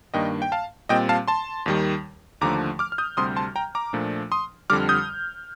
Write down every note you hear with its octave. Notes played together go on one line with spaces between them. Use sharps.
G2 D#3 A#3 D4 D#5 G5
G5
F5 A5
A#2 G3 C4 D#5 G5
F5 A5
A5 C6
D#2 D#3 G3
D#2 D3 F3 A3 A#5 D6
D6 F6
F6
D#6 G6
D2 C3 G3 C6 D#6
A5 C6
G5 A#5
A#5 D6
A#2 F3 A3 D4
C6 D#6
F2 D3 G3 D6 F6
D#6 G6